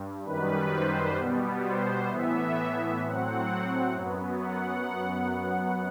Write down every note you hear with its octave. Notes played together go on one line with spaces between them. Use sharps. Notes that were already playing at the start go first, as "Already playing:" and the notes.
Already playing: G2
F#2 D#3 G3 B4
C5
B2 G3 B3
C5
A2 E3 B3 E5
A2 F#3 C4 F#5
F#2 F#3 B3
F#5